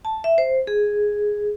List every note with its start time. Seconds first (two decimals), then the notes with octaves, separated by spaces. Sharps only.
0.05 A5
0.24 E5
0.38 C5
0.67 G#4